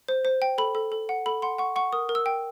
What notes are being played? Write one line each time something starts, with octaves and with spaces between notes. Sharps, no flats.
C5
C5
G5
A4 B5
A4
A4
F#5
A4 B5
F#5 C6
F#5 C#6
F#5 C#6
A#4 D#6
A#4
E6
G5